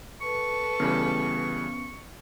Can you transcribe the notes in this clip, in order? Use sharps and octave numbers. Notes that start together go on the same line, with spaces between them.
A4 B4 C#6
C#3 E3 G3 B3 C#4